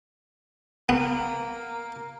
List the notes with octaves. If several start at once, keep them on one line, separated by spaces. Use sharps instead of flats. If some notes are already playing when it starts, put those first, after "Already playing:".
A#3 B3